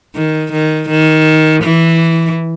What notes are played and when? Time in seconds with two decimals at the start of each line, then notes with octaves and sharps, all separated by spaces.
0.15 D#3
0.52 D#3
0.89 D#3
1.63 E3